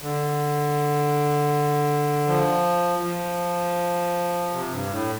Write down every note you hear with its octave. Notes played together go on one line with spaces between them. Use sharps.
D3
F3
F3
C3
G2
A2